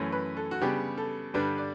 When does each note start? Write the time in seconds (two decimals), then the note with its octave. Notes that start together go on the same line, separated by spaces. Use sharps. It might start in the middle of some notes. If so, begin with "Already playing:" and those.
Already playing: F#2 E3 A3 C#4
0.12 B4
0.37 A4
0.51 F#4
0.61 C#3 G3 B3 D4 G4
0.97 A4
1.34 G2 D3 G3 D4 B4
1.58 D5